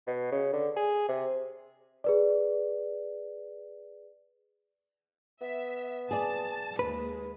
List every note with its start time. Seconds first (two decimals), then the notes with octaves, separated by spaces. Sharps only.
0.07 B2
0.32 C#3
0.53 D3
0.76 G#4
1.09 C3
2.04 G#4 B4 D5
5.41 B3 E5
6.11 G#4 D5 A5
6.79 D#2 G#3 B4